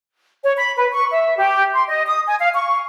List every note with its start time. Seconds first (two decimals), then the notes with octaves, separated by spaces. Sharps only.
0.43 C#5
0.57 B5
0.77 B4
0.93 C#6
1.11 E5
1.37 G4
1.73 C6
1.88 D#5
2.06 D#6
2.27 G#5
2.39 F5
2.54 C#6